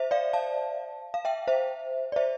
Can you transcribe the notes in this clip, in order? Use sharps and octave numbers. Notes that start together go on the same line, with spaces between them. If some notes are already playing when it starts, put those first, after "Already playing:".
Already playing: C5 E5
D5 F5
F5 A5
F5
E5 G5
C5 E5
D5
C5 E5